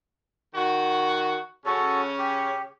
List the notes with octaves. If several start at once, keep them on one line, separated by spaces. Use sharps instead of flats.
D#3 F#4
C#3 C#4 F#4 A4
G4